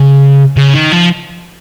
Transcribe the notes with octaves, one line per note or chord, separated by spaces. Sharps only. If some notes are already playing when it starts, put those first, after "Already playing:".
Already playing: C#3
C#3
D#3
F3